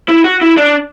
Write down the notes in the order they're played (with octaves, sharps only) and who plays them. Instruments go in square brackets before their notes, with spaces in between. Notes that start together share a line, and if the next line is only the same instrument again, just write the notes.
[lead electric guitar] E4
F#4
E4
D4